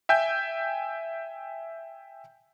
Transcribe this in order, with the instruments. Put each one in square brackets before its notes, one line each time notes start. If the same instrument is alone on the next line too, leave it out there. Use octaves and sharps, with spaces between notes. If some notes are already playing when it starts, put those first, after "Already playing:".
[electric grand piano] E5 G5 G#5 G6